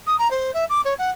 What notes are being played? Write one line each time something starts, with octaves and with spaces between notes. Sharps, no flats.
D#6
A#5
C5
E5
D6
C#5
F#5